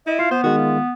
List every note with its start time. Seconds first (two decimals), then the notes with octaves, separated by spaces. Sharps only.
0.07 E4 D#5
0.19 F4 F5
0.31 B3 C5 C6
0.44 D#3 G#3 F#4
0.59 F4